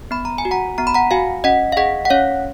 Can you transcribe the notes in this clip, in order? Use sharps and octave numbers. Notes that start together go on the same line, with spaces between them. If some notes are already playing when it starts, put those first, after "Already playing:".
B3 B5
A#5
G#5
F#4
F#5 A#5
B3 A#5
B5
F#5 A#5
F#4 F5 G#5
C#4 D#5 F#5
F5
G#4 D#5 F#5
F#5
C#4 C#5 F5